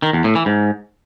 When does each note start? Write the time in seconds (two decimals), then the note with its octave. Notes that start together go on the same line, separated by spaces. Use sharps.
0.02 D#3
0.13 E2
0.24 A2
0.35 E3
0.46 G#2